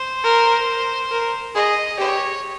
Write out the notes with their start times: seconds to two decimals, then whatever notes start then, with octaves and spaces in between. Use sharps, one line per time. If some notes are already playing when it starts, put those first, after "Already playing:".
Already playing: C5
0.24 A#4
1.12 A#4
1.55 G#4 D#5
1.98 G4 C#5